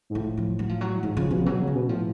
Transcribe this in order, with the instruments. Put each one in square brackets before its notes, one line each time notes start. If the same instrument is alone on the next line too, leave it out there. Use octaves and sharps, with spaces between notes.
[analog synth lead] G#2
[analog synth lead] A2 [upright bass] F3
[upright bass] F3
F#3
F3
F#3
[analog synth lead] G#2 [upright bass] F3
[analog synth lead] C#3 [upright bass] F3
[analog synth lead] B2 [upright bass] F3
[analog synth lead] C#3
[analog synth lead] B2 [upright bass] F#3
[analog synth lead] C#3
[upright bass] F#3
[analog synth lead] B2
[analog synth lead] A2 [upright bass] F3